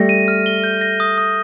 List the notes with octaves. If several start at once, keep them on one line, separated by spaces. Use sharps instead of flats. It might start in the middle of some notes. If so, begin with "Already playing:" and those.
Already playing: G3 A3 A#6
D#7
F6
G7
G6
A#6
D#6
D#6